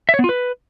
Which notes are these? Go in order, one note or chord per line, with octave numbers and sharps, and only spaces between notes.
E5
C#5
B3
F4
B4